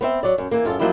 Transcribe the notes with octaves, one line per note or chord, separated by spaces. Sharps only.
B3 C4 E5
F#3 D5
F#2
E3 A#3
F#2 F4 A4
F3 F#3 A#3 D#4 E4 G4